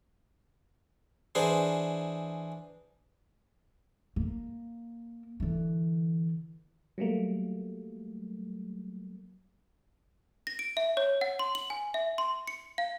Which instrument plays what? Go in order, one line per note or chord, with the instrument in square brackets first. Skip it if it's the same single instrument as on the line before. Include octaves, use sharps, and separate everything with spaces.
[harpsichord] E3 D4 G#4 C5
[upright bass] A#3
D3 E3
[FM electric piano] F#3 G3 A3 A#3
[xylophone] A#6
D7
E5
C#5
F#5
C6
F#7
G#5
E5
C6
C#7
F5